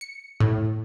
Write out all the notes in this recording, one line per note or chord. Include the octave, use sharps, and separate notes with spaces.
C#7
A2